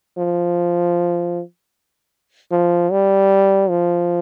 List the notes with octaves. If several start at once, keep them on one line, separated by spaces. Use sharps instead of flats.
F3
F3
G3
F3